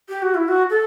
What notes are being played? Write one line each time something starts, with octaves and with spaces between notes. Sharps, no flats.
G4
F#4
E4
F#4
A4